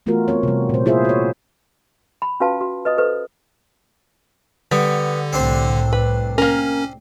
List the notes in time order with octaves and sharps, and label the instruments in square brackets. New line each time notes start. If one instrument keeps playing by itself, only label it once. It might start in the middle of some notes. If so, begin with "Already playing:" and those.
[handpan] E3 A3 B3 F4 F#4 A#4
B3 C4 C#5
C3 G3
A#2 C5
E4 F4 G#4 C5 E5
F#4 C#5
[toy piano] B5
C#4 F4 F#4 B4 F5 A5
F#4
B4 D#5 D#6
A4 B4 C5
[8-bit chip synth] D3 [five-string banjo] G3 [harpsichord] B3
[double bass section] C2 A2 [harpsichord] C4 D4 C5
[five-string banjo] B4
[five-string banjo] A#3 A#4 [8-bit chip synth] C#4